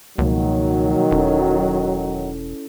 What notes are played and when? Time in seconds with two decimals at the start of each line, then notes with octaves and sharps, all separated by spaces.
0.18 C#2 B2 D#3 F3 F#3 A#3
1.11 E1 C#4 E4 A4